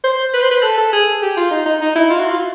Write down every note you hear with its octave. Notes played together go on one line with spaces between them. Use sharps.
C5
B4
C5
B4
A4
A4
G#4
G4
F4
D#4
D#4
D#4
E4
F4
F#4
F4